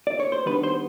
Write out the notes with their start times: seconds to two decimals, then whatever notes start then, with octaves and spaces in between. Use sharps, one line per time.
0.07 D5
0.20 C#5
0.32 C5
0.46 D#3 G3 B3 D4 B4
0.63 C5